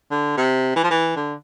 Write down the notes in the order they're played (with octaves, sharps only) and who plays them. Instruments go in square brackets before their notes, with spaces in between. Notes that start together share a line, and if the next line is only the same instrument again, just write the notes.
[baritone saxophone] D3
C3
E3
F3
E3
D3